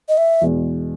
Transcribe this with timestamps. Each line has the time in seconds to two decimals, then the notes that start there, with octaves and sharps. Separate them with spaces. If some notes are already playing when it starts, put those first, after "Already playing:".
0.09 D#5
0.17 E5
0.41 E2 B2 G#3 B3